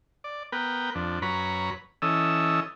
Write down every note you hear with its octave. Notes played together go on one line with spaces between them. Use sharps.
D5
B3 A#4 B4 G5
F2 D4
F#2 B4 C#5 A#5 B5
E3 C#4 A4 D#5 E6